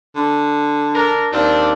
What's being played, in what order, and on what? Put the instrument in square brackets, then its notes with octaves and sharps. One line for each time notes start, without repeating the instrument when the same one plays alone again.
[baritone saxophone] D3
[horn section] D4 A#4
[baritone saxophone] D#2 [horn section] C4 D4